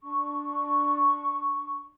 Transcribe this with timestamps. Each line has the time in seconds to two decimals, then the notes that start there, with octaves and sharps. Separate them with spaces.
0.03 D4 C#6